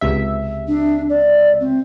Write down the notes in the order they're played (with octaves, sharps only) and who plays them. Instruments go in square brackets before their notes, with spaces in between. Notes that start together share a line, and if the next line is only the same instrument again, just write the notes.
[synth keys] C#2 C3 E5
[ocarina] D4
D5
C4